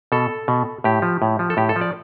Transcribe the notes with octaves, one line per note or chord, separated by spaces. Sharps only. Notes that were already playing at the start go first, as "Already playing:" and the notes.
B2 A4
B2
A2 G4
F3
A2
F3
A4
A2 G4
A4
F3
D5